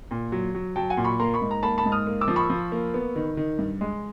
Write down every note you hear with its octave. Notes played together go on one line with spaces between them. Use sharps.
A#2
F#3
F#3
F#3 G5 A5
F#5 G#5
A#2
B5 C#6
A#3 A#5 C6
B5 C#6
G#2
A#5
A#3 A5 B5
A5 B5
G#2
D#6 F6
A#3
D6 E6
F3
B5 C#6
F3
A#3
B3
D#3
D#3
G2
G#3